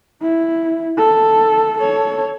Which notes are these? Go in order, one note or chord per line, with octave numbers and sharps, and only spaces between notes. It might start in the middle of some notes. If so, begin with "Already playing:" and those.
E4
A4
A4 C#5